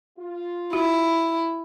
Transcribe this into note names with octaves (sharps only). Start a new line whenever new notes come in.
F4
E4 F#4